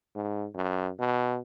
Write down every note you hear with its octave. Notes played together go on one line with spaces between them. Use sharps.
G#2
F#2
B2